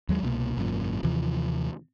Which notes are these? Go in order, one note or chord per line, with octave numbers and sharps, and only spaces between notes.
D#2 F#3 G#3
C2 B2 A#3
G#1 F#2 A#2
D#2 C3 E3 F3